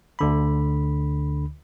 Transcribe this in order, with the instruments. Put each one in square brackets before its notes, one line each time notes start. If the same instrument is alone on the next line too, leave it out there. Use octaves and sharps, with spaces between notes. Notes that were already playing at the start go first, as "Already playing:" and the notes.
[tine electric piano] D2 D3 B5